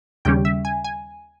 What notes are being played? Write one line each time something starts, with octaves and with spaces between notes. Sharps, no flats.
D#2 C#3 G3 C#4 G5
E5
G#5
G#5